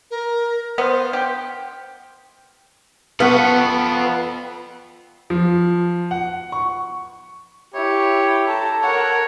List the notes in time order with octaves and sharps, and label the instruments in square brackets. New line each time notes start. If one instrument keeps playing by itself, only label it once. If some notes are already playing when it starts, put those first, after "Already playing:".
[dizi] A#4
[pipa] B3 F4 [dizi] C5
[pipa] G4 [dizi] F#5
[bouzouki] B3 [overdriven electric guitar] F4 A4 [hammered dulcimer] F5 F#5 C#6
[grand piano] F3
F#5
C#6
[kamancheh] E4 [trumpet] G4 [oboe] C#5
[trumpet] A4 [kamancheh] A5 A#5
[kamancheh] A#4 F#5 [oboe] C#5